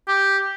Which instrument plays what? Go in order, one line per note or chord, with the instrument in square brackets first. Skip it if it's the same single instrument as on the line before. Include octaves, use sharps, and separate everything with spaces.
[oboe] G4